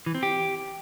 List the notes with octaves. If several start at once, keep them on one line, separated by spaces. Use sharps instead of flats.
E3
C4
G4